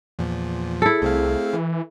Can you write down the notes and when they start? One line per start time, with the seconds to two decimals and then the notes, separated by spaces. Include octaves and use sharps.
0.19 E2 A#2 F3
0.82 E4 G#4 A4
1.02 C2 A3 C4 F5
1.53 E3